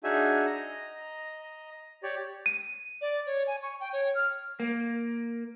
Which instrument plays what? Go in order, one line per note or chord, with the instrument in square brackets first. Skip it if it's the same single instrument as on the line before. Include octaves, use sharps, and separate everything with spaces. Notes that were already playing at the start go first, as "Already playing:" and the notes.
[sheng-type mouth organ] D4 D#4 F#4 G#4 E5 G#5
D#5 A#5
G4 C#5 D5
[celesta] D#7
[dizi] D5
C#5
G#5
C#6
G5
C#5
F6
[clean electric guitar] A#3